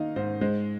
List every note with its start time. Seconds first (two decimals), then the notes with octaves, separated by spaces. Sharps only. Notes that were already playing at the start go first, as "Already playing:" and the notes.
Already playing: D#3 A#3 D#4 D#5 F5
0.16 G#2 C5
0.41 G#3 C5